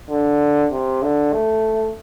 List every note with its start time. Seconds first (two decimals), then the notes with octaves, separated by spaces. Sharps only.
0.10 D3
0.72 C3
1.03 D3
1.33 A3